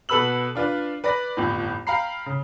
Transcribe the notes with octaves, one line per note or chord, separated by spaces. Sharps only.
B2 A4 B4 B5 E6 F#7
D4 F4 B4 D5
B4 D5 B5 A#6
G1 F2 A2
F5 G5 A#5 B5 C7
C#3